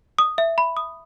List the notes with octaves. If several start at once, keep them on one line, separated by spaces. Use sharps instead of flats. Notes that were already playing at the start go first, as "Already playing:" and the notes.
D#6
E5
B5
D#6